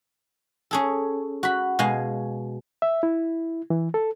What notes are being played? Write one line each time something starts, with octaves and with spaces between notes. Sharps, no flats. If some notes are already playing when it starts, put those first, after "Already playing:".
C#4 G#4 A4
F#4 B5
B2 G#3 F5 G#5
E5
E4
E3
A4